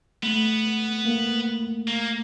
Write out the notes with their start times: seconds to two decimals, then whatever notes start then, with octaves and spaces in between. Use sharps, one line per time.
0.23 A3 B3
1.05 A#3
1.88 A#3